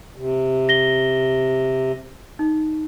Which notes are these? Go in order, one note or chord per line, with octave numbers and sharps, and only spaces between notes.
C3
A#6 G7
D#4